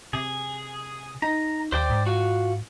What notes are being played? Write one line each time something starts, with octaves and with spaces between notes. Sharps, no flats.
C3 G#4
D#4 A#5
D#2 C5 D5 G5
G#2
F4 F#4